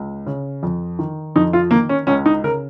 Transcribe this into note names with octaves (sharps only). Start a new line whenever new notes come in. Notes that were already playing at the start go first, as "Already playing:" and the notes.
Already playing: C#2
C#3
F2
D#3
F2 D#4
F4
D#3 A#3
C#4
C#2 C#4
D#4
C#3 A#4